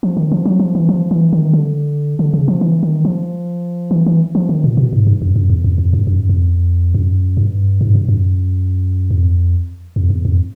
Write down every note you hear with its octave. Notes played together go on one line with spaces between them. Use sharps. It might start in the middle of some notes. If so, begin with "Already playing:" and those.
F3
D#3
F3
F#3
F3
E3
F3
E3
D#3
D3
D3
C#3
F3
E3
D#3
F3
E3
E3
F3
D#3
A#2
B2
G#2
G2
F#2
F#2
E2
F2
F2
G2
F#2
F2
F#2
G2
G#2
G2
F#2
F2
F2
E2
F2